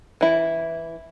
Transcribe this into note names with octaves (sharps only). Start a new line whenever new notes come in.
E3 E4